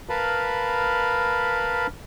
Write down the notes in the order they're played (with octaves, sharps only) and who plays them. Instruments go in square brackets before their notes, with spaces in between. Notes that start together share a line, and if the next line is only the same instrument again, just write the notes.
[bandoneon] A#4 B4 F5 A5 B5